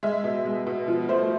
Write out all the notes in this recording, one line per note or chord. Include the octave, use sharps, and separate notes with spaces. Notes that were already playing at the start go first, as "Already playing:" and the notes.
G#3 E5
B2
G#3
B2
F3
A3 C5